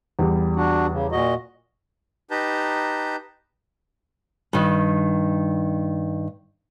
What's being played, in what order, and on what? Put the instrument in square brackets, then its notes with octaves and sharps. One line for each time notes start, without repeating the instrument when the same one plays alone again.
[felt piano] E2 G3
[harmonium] D4 F#4
C#3
A#2 F#4 D#5
[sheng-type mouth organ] D#4 G4 B4 A5 A#5 G6
[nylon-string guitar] G2 D#3